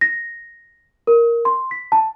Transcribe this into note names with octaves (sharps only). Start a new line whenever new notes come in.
A#6
A#4
C6
B6
A5